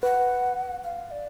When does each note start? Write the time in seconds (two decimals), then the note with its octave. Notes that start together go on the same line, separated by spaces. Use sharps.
0.03 B4 F#5
0.84 F5
1.11 D5